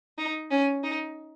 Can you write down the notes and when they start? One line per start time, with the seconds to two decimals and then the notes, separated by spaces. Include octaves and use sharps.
0.18 D#4
0.51 C#4
0.84 D#4